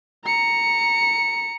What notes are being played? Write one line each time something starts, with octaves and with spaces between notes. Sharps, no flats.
A#5 C#7